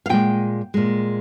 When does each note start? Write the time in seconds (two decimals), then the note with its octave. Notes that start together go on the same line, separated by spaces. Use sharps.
0.06 F5
0.09 A#2 G#3 G5
0.74 A#2 G#3